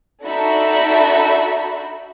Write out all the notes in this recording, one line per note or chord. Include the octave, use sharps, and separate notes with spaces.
D4 D#4 F#4 A4 E5 B5